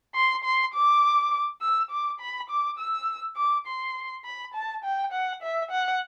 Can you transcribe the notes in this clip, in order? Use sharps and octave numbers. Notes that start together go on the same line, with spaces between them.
C6
C6
D6
E6
D6
B5
D6
E6
D6
C6
B5
A5
G5
F#5
E5
F#5